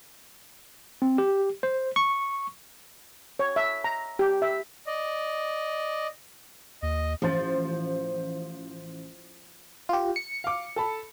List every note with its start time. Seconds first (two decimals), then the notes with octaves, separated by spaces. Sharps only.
1.02 C4
1.18 G4
1.63 C5
1.96 C#6
3.39 C#5
3.56 E5
3.84 A#5
4.19 G4
4.42 E5
4.87 D5 D#5
6.82 D#2 D#5
7.22 A1 F3 C5 A6
9.89 F4 G4
10.16 C#7
10.44 F5 D6
10.76 A4 A5 B5